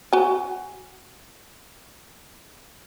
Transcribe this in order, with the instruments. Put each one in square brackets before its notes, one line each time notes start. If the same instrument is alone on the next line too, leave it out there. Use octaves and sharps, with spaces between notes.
[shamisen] F#4 G#5